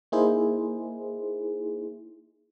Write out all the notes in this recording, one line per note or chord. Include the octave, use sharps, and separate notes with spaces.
A#3 D#4 E4 G#4 C5